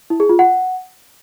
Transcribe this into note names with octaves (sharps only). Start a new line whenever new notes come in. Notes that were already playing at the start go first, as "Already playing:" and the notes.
E4
G#4
F4
F#5